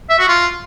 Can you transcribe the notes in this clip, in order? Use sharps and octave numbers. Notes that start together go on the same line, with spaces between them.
E5
F#4
F4